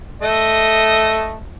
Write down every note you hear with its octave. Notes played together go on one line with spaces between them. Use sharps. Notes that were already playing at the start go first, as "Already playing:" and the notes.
A3 D#5